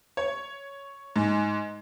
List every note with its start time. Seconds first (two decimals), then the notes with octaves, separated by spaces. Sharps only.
0.17 C#5
1.16 G#2